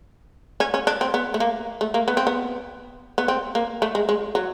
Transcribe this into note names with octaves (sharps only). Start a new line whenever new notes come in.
C#4
C#4
D4
C4
B3
A3
A#3
A3
A#3
B3
C4
B3
B3
C4
A#3
A3
G#3
G#3
F#3